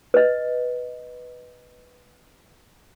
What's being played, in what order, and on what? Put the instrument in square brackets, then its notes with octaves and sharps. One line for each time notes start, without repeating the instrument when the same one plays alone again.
[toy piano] B4 D#5